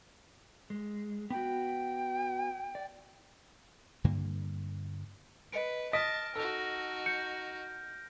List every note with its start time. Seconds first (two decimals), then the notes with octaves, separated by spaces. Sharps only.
0.70 G#3
1.30 B3 F#4 G5
2.75 D5
4.04 G2 D3 G3 A#3
5.52 B4 D#5 C#7 D7
5.93 D#5 A5 F6 A#6 B6 D7
6.36 D#4 F#4 A4
7.06 G6 C#7